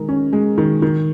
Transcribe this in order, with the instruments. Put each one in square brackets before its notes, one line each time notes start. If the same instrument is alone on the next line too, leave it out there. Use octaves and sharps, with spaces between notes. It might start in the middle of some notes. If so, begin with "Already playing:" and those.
Already playing: [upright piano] D#3 G#3 A#4
C#4
G#3
D#3
D#3